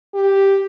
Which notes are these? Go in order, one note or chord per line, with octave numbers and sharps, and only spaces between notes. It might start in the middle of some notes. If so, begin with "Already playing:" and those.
G4